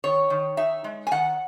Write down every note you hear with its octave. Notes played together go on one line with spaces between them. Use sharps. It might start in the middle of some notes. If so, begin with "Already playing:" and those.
D#3 C#5
D#3
D#4 E5
G#3
G#5
D#3 F#5